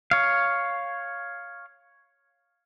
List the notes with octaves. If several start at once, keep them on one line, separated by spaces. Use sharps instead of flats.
C#5 F5